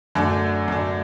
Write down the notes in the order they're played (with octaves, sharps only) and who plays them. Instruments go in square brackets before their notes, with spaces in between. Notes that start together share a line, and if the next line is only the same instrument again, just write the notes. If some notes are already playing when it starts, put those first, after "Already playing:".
[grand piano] F#2 D3 A3 D4
F#2 D3 A3 D4